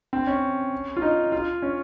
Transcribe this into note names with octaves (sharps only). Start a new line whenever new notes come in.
C4
C#4
F4
D#4
F4
C#4